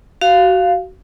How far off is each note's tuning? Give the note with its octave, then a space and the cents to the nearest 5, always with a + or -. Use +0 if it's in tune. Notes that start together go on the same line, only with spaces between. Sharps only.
F#4 +25 F5 +0